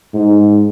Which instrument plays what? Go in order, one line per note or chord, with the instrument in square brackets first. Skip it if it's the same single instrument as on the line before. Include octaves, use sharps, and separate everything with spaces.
[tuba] G#2